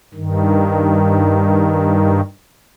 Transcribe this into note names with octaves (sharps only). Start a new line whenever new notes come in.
G2 D#3